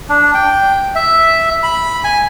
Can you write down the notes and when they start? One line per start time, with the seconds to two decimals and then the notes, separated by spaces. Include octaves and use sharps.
0.09 D4
0.34 G5
0.95 E5
1.63 B5
2.04 G#5